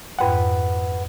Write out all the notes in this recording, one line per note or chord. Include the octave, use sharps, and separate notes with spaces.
F2 G#2 B4 F#5 G5